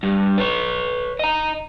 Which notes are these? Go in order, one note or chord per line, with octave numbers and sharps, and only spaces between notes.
G2
B4 C#5
D#5 A#5